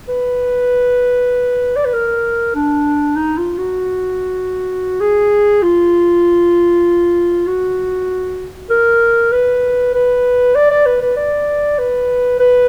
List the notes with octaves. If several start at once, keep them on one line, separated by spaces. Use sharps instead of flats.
B4
D5
B4
A#4
D4
D#4
F4
F#4
G#4
F4
F#4
A#4
B4
B4
D5
D5
B4
B4
D5
B4
B4